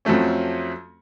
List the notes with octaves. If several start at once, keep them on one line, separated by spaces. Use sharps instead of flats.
F2 F3 F#3 A3 C#4